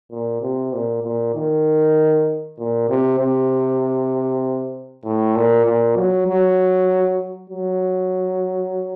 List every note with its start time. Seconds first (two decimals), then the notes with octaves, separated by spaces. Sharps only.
0.11 A#2
0.42 C3
0.73 A#2
1.03 A#2
1.35 D#3
2.58 A#2
2.89 C3
3.19 C3
5.05 A2
5.35 A#2
5.65 A#2
5.96 F#3
6.28 F#3
7.50 F#3